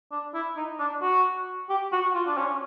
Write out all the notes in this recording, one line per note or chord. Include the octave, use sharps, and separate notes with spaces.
D4
E4
D#4
D4
F#4
G4
F#4
F4
D4
C#4